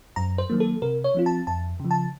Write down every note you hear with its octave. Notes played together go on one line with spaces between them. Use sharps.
F#2 A#5
C5
D#3 F#3 A#3
A4
C3 A#4
C#5
F3 C4 F4
A5
F2 A5
C#3 F3
A5